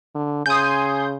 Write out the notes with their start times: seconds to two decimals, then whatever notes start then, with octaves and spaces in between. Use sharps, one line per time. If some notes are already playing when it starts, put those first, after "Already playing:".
0.15 D3
0.46 C#3 G#5 C6 D#6 G6